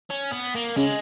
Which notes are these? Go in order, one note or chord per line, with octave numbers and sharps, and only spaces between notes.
C#4
B3
A#3
C#3 G#3